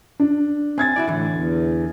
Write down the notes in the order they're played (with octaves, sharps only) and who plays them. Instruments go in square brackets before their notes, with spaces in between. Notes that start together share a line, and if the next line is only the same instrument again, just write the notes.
[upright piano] D4
[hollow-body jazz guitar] C4 [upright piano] G#5 G#6 A6
[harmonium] E4 [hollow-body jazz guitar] F#4 G4 D5
[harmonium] A2 [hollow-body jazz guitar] D3 E3
[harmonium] E2